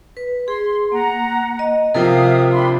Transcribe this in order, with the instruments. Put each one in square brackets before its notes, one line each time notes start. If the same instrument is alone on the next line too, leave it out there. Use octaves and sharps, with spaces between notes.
[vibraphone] B4
[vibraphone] G#4 [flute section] C6
[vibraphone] A#3 [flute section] F#5 A#5
[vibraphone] D#5
[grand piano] C3 F3 [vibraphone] A#4 G5 [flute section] E5 F5 D#6
[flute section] D4 B5 C6